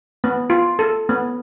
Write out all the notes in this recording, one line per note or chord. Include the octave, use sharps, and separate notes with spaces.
B3
F4
A4
B3